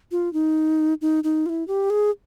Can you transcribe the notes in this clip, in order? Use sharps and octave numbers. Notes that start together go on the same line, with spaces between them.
F4
D#4
D#4
D#4
F4
E4
G4
G#4